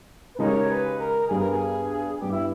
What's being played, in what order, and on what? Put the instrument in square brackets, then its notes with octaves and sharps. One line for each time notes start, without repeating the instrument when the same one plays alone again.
[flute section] B4
[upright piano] C#3 G#3 D#4 G4 [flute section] A#4 C#5
[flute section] B4
A#4
[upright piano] G2 G3 B3 [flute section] G#4
[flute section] A#4
G#4
[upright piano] G2 G3 B3 [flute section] G4
[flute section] E4